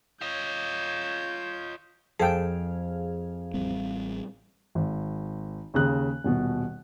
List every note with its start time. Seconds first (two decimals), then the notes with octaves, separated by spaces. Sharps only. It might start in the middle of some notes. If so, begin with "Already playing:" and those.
0.21 F4 C#5 D#5 G6
2.19 F2 G#4 A4 F5 G5 A5
3.54 A1 G3 C4
4.75 G#1
5.74 D#2 C#3 F#6
6.24 D#1 B2